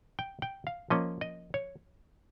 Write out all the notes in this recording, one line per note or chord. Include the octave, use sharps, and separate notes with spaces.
G5
G5
F5
F3 A#3 C#4 D#5
D#5
C#5